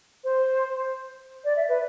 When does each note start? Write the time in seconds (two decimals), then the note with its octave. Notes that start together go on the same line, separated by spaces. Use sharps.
0.24 C5
1.44 D5
1.56 E5
1.68 B4